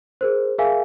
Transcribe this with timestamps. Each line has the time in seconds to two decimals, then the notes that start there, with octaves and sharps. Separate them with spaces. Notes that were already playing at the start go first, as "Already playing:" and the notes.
0.21 G#4 A#4 C5
0.58 G#4 A#4 E5 F5 G#5